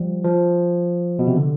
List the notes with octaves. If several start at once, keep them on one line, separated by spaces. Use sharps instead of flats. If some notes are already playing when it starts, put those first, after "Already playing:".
Already playing: F3 G3
F3
B2
C3
D3